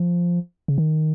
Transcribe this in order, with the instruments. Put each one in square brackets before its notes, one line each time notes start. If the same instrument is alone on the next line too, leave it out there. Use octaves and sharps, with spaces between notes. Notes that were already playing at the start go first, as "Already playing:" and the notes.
Already playing: [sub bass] F3
C#3
D#3